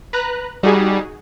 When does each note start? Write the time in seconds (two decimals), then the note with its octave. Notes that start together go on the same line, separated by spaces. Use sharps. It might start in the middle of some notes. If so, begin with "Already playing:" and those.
0.13 B4 A#5 F#6
0.63 G3 D#4 F#4 G#4